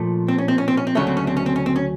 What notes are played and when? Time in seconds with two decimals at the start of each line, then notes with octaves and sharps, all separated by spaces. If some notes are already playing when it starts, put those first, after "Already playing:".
Already playing: A#2 F3 A3
0.28 C4
0.38 C#4
0.48 C4
0.58 C#4
0.68 C4
0.77 C#4
0.87 C4
0.95 D2 C#3 F#3 A3 C#4
1.07 C4
1.17 C#4
1.27 C4
1.37 C#4
1.46 C4
1.56 C#4
1.66 C4
1.76 C#4